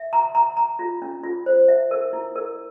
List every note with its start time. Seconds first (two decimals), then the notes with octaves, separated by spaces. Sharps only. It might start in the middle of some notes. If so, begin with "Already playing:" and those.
Already playing: E5
0.13 A#5
0.35 A#5
0.57 A#5
0.79 F4
1.02 C#4
1.24 F4
1.46 C5
1.68 E5
1.91 A#4
2.13 E4
2.36 A#4